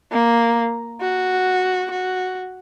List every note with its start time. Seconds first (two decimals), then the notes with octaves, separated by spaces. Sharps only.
0.12 A#3
1.01 F#4
1.91 F#4